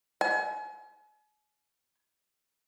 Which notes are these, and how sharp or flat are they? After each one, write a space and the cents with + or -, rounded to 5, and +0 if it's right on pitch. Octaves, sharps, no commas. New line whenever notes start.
G#5 +40